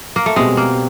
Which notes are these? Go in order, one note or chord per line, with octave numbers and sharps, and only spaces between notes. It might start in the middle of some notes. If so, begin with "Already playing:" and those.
A#3
A3
B2 G3 G#3 C4
A#3